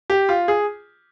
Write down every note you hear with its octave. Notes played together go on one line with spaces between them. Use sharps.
G4
F4
G#4